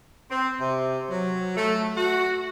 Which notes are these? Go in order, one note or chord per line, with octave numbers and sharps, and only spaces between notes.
C4
C3
F#3
A3
F#4